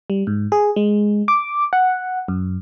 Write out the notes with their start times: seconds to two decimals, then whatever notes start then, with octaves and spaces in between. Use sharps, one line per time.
0.10 G3
0.27 G#2
0.52 G#4
0.76 G#3
1.28 D6
1.73 F#5
2.28 F#2